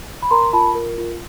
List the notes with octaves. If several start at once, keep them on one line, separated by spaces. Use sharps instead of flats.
B5
A#4 A#5 C6
F4 A5 B5
A#4
F4